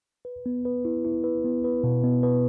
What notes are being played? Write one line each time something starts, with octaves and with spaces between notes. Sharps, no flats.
B4
B3
B4
E4
E4
B4
B3
B4
B2
B3
B4